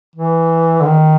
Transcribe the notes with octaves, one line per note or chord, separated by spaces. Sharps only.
E3
D3
D#3